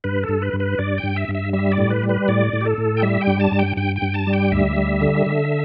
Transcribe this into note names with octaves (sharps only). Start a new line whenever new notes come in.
G2 B4
A4
G2
B4
G2
B4
G2 D5
G5
G2
E5
G2
E5
G3 E5
D5
A2
B4
G3
B4
A2 D5
A2
G4
A4
A2
G5
G3 E5
G5
G2
A5
G2
G5
G2 G5
G5
G2
A5
G3
G5
D2 E5
G3
D3
D3